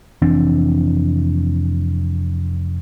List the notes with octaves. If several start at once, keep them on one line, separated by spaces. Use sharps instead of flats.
F1 E3 C4 D4